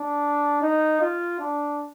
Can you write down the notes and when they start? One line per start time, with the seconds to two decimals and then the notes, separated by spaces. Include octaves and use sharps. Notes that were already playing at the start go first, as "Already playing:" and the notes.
Already playing: D4
0.62 D#4
1.01 F4
1.40 D4